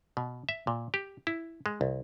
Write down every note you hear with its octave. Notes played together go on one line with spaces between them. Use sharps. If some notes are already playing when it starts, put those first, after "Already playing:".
B2
E5
A#2
G4
E4
G#3
C2